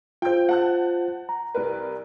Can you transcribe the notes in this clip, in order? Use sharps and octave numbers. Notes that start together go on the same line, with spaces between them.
F4 C5 G5 G6
F#5 A5 F#6
A#5
C2 A#4 B4